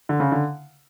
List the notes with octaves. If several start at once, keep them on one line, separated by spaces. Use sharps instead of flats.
D3
C#3
D3